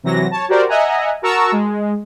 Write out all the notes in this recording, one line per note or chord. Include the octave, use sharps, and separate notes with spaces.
C3 E3 F#3 A#6
C#5 A5
F#4 G4 A#4 C5 D5
D#5 E5 F#5 G#5 A#5
F#4 A#4 A5 A#5 C#6 E6
G#3